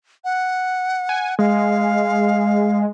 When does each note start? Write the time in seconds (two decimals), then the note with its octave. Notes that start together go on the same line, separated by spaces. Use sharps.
0.24 F#5
1.09 G#5
1.39 G#3 F5